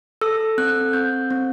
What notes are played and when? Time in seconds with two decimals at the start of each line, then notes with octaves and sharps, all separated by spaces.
0.21 A4 E6
0.58 C4 F#6
0.93 C4 G6
1.30 C4